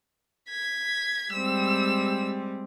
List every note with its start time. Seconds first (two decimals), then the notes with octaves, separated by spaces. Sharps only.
0.50 G#6 B6
1.33 G3 G#3 C4 E6